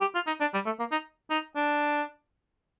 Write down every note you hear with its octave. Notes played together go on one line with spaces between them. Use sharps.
G4
F4
D#4
D4
G3
A3
A#3
D#4
D#4
D4